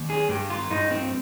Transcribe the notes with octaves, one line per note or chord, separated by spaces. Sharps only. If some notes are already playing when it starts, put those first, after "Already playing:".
Already playing: D#2
G#4
G2 G4
F4
G2 D#4
C4